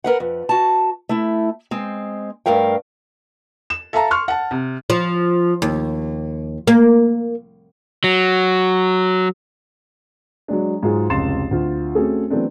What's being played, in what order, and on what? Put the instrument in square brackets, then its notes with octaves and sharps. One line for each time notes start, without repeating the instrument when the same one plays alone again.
[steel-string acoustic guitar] A#4 B4 F#5
F2
F#4 A5
A3 E4
G#3 C4
G2 A3 A#4 F5 G5
[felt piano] E7
A4 E5 F5 A5 A#5
C6 C#6 F6
F#5 A5
C3
[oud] F3
D#2
A#3
[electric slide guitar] F#3
[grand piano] F#3 G#3 D4
G#2 F#3 G#3 F4 G#4
F1 C#2 C6 A6 C7 E7
D2 F4
A3 C4 C#4 F#4 G#4 A4
E3 F#3 A3 B3 C4 D4